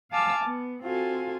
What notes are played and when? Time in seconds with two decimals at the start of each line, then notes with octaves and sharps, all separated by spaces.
0.11 F5 G#5 A5 D6 E6 F6
0.45 B3
0.83 C4 F4 F#4 A4 G#5